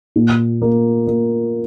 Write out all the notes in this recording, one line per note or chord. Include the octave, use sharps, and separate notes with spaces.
A#2
A#3
A#3